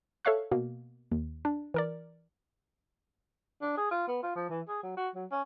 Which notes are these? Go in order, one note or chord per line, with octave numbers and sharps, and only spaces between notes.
A4 C#5 E5 F5 C#6 F#6
B2 A#3
D#2
D4
E3 A#4 D5
D4
G#4
F4
B3
F4
F3
E3
G#4
F#3
F#4
F#3
C#4